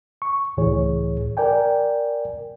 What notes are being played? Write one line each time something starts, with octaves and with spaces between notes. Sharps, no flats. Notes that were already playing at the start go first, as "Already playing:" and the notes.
C#6
C#2 A2 E3 G#4 C#5
A#4 D5 G5 G#5